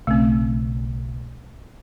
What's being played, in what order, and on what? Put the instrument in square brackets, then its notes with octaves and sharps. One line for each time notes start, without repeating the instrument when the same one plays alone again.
[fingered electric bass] B1 C#3 C#4 [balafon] A3 C4